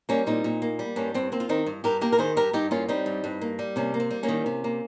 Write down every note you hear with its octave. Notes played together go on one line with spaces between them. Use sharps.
G3 A#3 C#4
A#2 C4 D#4
A#2
A#3
G3
G2 A#3 C#4
G2 C4
A#3 C4
F4
D#3 C4 D#4
G2
G2 G4 A#4
A#3 G4 A#4
A#4
D#3 G#4 C5
G2 G4 A#4
G2 D#4 G4
A#3 C#4 F4
G3 C4 D#4
G2
G2
A#3
G3
C3 A#3 C#4
A#3
C4
G3
A#3 C#4
D#3
C3
A#3